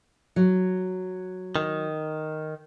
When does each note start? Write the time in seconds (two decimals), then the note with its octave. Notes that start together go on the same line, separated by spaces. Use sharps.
0.36 F#3
1.56 D#3